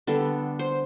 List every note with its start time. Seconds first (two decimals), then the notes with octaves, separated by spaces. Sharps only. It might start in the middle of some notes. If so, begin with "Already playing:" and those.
0.07 D3 G3 B3 A4
0.59 C5